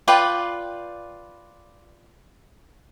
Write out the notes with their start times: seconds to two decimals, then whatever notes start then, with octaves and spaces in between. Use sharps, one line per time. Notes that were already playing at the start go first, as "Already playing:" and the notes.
0.08 F4 B4 D5 G5